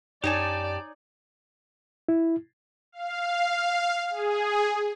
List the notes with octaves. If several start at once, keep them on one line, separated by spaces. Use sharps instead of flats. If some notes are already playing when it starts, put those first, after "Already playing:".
F#2 D#4 G4 C#5 D5 G#5 A5
E4
F5
G#4